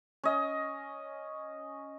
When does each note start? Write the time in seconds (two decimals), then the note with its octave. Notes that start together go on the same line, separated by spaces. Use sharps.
0.24 C#4 D#5